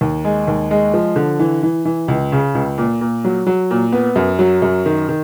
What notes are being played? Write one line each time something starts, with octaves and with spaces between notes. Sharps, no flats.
D#2
G#3
D#2
G#3
F3
D3
E3
E3
E3
C#2
C#3
C#2
A#2
A#2
F#3
F#3
A#2
B3
F#2
F#3
F#2
D#3
D#3